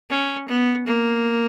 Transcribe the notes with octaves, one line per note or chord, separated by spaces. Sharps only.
C#4
B3
A#3